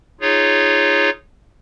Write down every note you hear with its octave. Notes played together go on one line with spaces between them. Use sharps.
D#4 F4 G#4 C#5